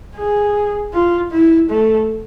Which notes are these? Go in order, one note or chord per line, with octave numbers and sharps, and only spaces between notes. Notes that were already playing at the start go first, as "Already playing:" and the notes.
G#4
F4
E4
A3